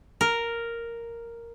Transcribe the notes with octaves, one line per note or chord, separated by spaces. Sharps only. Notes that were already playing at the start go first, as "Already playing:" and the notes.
A#4